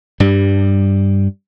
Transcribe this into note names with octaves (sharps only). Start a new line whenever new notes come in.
G2 G3